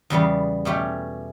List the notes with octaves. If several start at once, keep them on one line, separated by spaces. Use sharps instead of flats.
E2 C#3 G3 B3
B2 A3 C#4 G4